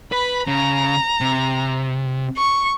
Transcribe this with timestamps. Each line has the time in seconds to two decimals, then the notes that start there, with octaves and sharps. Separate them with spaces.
0.12 B4 B5
0.47 C#3 A#5
1.21 C3
2.37 C#6